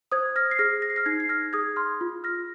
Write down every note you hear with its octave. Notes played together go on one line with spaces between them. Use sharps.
C5 D#6 G#6
F6 A#6
C7
G#4 F6 A#6
A#6
C7
F6 A#6
D#4 G#6 C7
C7
F6 A#6
G#4 D#6 G#6
C6 F6
F4
F6 A#6